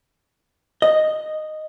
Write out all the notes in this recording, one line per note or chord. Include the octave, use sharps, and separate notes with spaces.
D#5